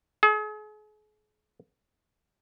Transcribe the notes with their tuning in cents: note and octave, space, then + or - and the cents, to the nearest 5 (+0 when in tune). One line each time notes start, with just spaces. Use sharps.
G#4 +40